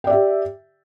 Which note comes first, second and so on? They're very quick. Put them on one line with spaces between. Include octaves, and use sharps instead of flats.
G5 D5 E5 G4